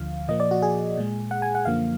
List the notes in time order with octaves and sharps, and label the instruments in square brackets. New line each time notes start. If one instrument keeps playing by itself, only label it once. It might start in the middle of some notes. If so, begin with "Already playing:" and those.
Already playing: [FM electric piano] D2 D3 F3 F5
A#2 F3 A#3 D#5
D5
F#4
G#4
A#2 G#3
F#5
G#5
F#5
F#2 D3 F3 A#3 F5